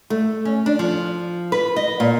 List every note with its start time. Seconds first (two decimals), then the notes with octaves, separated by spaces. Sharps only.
0.10 A3
0.45 C#4
0.66 D4
0.79 F3
1.52 B4
1.76 D#5
2.00 A#2